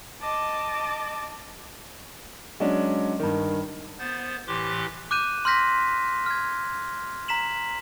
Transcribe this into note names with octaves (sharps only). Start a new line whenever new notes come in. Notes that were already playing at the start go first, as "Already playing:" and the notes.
D#5 A5 D6
F#3 G#3 C#4 D4
G2 D#3
B3 C5 A6
A2 E3 G4 C6 D6 F#6
D6 F#6 G6 D#7 E7
C6 F6 G6 A#6 B6
F6 G#6
A#5 B6 E7 F#7